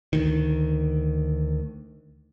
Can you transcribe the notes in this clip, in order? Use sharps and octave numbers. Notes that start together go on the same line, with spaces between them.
D2 D#3